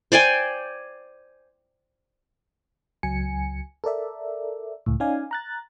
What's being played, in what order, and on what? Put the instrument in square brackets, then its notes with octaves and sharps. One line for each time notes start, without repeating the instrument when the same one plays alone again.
[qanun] C5 D5 G5 G#5
[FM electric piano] C#2 F#3 G#5 C#7
A4 A#4 D5 E5
C#2 A2
C#4 D#4 D5 F5 G#5
A#5 F#6 A6